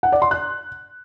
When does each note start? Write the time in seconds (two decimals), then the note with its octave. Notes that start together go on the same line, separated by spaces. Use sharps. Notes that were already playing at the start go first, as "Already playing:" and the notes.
0.03 F#5
0.12 D5
0.22 C6
0.31 F#6